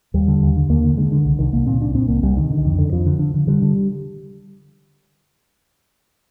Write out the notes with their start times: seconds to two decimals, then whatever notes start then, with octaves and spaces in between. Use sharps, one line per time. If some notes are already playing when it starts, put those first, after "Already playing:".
0.14 D#2 G3
0.28 D3
0.43 D#2
0.57 D3
0.69 D#2 A#3
0.84 D3
0.97 D3 G#3
1.12 D3
1.25 C2
1.39 C2 D#3
1.53 C2 A#3
1.67 A#2 C4
1.81 C2 D4
1.95 A#2 C4
2.08 C2 A#3
2.23 C2 G3
2.37 D3 D#3
2.51 D3
2.65 F2
2.79 D3
2.92 F2 F3
3.06 D3
3.19 D3
3.34 D3
3.47 D3 G3
3.62 D3